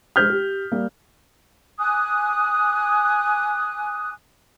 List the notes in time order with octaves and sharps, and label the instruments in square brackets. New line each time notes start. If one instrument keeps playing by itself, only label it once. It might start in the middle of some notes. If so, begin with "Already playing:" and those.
[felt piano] G#3 C5 B6 [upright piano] F6 G6
[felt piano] G4
G3 A#3
[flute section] G#5 D6 D#6 F#6